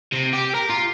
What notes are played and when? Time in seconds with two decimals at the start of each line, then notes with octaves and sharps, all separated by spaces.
0.13 C3
0.33 G4
0.55 A#4
0.70 F4